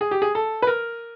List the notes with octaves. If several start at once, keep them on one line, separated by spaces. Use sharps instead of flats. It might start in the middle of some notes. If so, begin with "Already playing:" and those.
G#4
G4
G#4
A4
B4
A#4